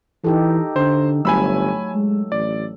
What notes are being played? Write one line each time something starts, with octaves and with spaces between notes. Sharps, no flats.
E3 D#4 G4 A4
D3 C5
G1 F#3 A3 G#5 B5 E6
G#3
A1 D5